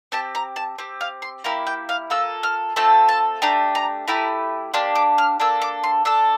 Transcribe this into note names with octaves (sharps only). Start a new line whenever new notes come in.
C4 G4 A5
A#5
A5
C4 G4
F5
C6
A#3 E4 G4 A#5
G5
F5
A#3 F4 A4 E6
F6
A3 C4 F4 A4 A5
A5
A3 D4 G4 A#5
A#5
A3 E4 G4 A#5
A#3 D4 G4 C6
D6
F6
A#3 D4 A4 E6
D6
C6
D4 A4 E6